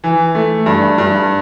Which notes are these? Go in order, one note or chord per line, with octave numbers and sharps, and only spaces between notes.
E3
A3
G2
G2